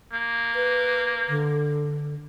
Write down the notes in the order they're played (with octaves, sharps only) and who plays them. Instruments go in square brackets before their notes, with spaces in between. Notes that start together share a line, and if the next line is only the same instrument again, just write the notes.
[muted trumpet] A#3
[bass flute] B4
D3